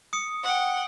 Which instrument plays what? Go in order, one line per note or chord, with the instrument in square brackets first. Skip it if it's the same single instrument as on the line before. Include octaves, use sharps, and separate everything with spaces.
[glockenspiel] D#6 C#7
[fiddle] F#5 G5